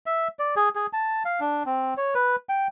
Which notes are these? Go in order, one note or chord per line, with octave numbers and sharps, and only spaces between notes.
E5
D5
G#4
G#4
A5
F5
D4
C4
C#5
B4
G5